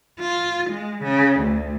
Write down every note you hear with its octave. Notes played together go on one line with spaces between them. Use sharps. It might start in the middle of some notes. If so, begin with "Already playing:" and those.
F4
G#3
C#3
D2